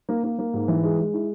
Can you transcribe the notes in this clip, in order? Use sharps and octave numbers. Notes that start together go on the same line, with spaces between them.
A#3
A#3
A#3
G#2
E3
G#3
G#3
E4